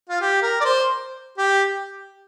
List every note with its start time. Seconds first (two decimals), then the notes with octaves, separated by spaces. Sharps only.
0.09 F4
0.21 G4
0.42 A#4
0.61 D5
0.65 C5
1.38 G4